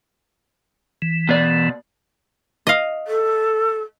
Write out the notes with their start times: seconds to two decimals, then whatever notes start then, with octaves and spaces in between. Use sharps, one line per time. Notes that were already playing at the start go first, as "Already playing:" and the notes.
1.02 E3
1.29 B2 D5
2.67 D#5 F5
3.07 A4